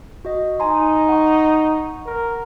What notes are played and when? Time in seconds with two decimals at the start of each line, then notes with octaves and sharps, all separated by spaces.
0.25 F#4 D#5
0.60 D#4 G#5 A#5 C6
1.09 F#5 C#6
2.06 A#4